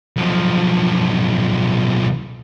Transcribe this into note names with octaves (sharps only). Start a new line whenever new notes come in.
B1 F3